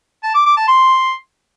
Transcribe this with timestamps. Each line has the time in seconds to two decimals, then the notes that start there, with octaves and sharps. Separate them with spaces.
0.23 A5
0.34 D6
0.46 D6
0.57 A5
0.68 C6